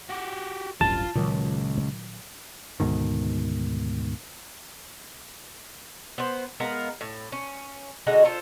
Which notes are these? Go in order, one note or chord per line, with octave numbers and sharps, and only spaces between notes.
F#4 G4
D1 A1 G2 F4 A5
C#2 A#2 D#3 F#3
D2 G#2 B2 D#3
B3 C5
G#3 B3 A#4 F5
A2
C#4
D3 G#3 D#4 F#4
F4 A4 C5